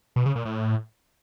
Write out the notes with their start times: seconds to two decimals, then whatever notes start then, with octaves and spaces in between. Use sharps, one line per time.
0.16 B2
0.26 C#3
0.36 A#2
0.45 A2